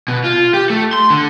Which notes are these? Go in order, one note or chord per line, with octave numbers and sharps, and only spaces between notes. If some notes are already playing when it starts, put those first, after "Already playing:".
B2
F4
G4
A3
C6
D3